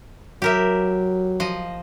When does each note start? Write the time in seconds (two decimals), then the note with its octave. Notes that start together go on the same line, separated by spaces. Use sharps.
0.42 F#3 G4 A#4 E5
1.40 F3 D#5